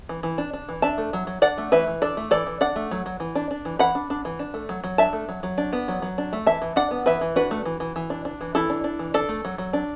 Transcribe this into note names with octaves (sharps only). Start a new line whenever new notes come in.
E3
E3
D4
D4
E3
D4 E5 A5
A3
F#3
F#3
D4 D5 F#5
A3
E3 B4 E5
E3
D4 A4 D5
A3
E3 A4 D5
E3
D4 D5 F#5
A3
F#3
F#3
E3
D4
D4
E3
E3 F#5 B5
D4
D4
E3
D4
A3
F#3
F#3
D4 E5 A5
A3
F#3
F#3
D4
B3
F#3
F#3
D4
A3
E3 E5 A5
E3
D4 D5 F#5
B3
E3 B4 E5
E3
D4 F#4 B4
A3
E3
E3
E3
D4
D4
E3
E3 E4 A4
D4
D4
E3
D4 A4 D5
A3
F#3
F#3
D4